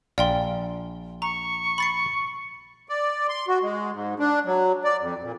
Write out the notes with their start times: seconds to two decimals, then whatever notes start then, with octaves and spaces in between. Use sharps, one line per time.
0.18 A#1 D5 F5 G5 C6
1.22 A#5 C#6
1.78 B5 A6 C7
2.89 D5
3.29 C6
3.48 F#4
3.62 G#3
3.92 G#2
4.20 D4
4.45 F#3
4.84 D5
5.00 F2
5.23 A#2